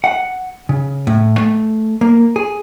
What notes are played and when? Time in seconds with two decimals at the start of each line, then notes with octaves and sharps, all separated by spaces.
0.04 F#5
0.69 C#3
1.07 A2
1.38 A3
2.01 A#3
2.36 G#4